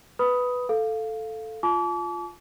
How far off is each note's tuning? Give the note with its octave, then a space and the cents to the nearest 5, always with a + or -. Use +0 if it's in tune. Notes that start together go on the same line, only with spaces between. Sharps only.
B4 +0 B5 +0 D#6 +10
A4 +0 F5 +0
F4 +0 A5 -40 D6 -35